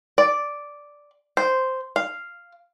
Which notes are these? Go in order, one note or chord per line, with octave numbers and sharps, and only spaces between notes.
D5
C5
F5